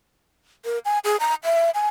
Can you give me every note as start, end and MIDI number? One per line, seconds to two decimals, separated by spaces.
0.65 0.79 70
0.85 0.99 80
1.04 1.17 68
1.20 1.35 82
1.44 1.70 76
1.74 1.89 80